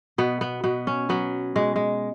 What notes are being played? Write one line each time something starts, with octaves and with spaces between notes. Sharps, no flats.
B2 B3
B3
B2 B3
C#4
F#3 B3
B2 G#3
G#3